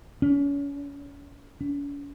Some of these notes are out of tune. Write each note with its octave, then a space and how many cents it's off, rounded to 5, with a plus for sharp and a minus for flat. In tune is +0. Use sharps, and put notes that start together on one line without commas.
C#4 +35
C#4 +45